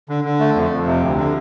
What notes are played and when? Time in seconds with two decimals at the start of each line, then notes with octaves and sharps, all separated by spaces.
0.09 D3
0.24 D3
0.40 A3
0.55 F2
0.71 F2
0.86 C3
1.02 D2
1.17 D3